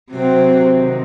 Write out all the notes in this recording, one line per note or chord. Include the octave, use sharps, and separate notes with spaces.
C3 F#3 C4
C3 D#3